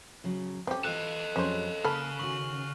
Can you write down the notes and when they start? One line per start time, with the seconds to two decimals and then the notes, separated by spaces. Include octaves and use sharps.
0.24 C#3 F#3
0.67 C4 C#4 G4 A4
0.84 E3 F4 A4 D#5 F#6
1.36 F2 F#3 C#4 G#4 C5
1.84 C#3 A#3 A4 B5 F6
2.19 D#3 C#4 F#4 C#6 F#7